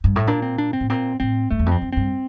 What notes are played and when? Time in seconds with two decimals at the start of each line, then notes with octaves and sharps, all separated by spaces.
0.04 G2
0.16 A2
0.27 A#2 D4
0.42 C4
0.58 D4
0.73 C4
0.80 A2
0.90 A#2 C4
1.20 A2 C4
1.51 G2 A3
1.59 E2
1.66 F2
1.72 C4
1.81 F2
1.92 G2 C4